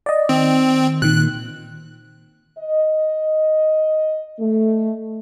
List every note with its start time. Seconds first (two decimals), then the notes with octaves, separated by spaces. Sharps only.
0.06 D5 D#5
0.29 D#3 C4
1.02 A#2 D#3 F#6
2.59 D#5
4.40 A3